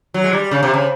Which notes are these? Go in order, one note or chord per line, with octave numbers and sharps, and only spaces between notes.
F#3
G#3
G3
C#3
C3
C#3